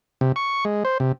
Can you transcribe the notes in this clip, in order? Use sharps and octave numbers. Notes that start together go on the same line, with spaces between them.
C3
C#6
G#3
C5
C3